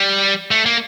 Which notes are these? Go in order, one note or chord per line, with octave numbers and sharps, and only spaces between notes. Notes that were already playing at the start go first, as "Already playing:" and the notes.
Already playing: G3
A3
A#3